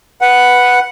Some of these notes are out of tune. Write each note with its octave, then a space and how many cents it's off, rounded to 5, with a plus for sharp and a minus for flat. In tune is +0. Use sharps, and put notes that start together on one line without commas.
B4 +0 F#5 +0